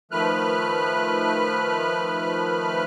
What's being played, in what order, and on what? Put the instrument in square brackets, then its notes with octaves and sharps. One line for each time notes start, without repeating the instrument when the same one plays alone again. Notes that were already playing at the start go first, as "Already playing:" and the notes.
[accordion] D#3 F3 A3 B4 F6 F#6